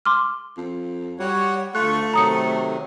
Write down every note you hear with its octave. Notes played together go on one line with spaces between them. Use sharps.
C6 D6 F6
F2
G3 F#4 C#5 F#5
D2 A3 F4 C#6 F#6
C3 D#3 F#3 A#5 D#6 C#7